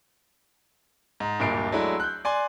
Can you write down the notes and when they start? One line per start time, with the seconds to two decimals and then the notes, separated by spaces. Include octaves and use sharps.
1.20 G#2
1.40 D1 G2 A#2 C7 D7
1.72 F#3 G#3 A3 D4 E4
2.00 F#6 G6
2.25 D5 G#5 C6